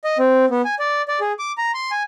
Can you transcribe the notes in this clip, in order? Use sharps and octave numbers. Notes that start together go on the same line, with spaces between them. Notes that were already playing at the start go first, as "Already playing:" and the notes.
D#5
C4
B3
G#5
D5
D5
G#4
D6
A#5
C6
G#5